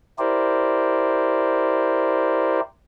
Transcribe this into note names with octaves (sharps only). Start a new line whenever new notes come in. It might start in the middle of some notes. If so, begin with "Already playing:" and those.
E4 G4 A#4 C5 D5